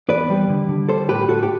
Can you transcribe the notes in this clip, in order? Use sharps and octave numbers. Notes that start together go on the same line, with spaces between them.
E2 B4 D5
G3
D3
D3
G3 A4 C5
A2 G4 B4
A2 F#4 A4
G4